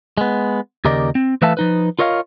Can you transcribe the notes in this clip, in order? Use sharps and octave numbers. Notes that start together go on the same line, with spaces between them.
G#3 B3
D#2 C#3 G4 A#4 D5 D#5
C4
E3 A3 B4 E5 F5 A5
F3 D#4 B4
F4 A#4 C#5 D#5 F5